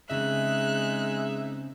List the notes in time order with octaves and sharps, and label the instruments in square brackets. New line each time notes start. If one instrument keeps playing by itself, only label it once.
[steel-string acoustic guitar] C#3 G3 C4 [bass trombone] G#3 [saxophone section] D#4 G#4 E5 [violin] F#6